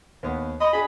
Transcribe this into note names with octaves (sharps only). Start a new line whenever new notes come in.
D#2 B3
D#5 B5
D4 G#4 B5